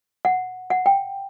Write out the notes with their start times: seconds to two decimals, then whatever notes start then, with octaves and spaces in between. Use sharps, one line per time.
0.25 F#5
0.70 F#5
0.86 G5